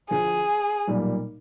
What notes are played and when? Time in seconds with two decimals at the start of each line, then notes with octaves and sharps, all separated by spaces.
0.10 D2 D3 F3 G#4
0.88 B1 A#2 G3 A#3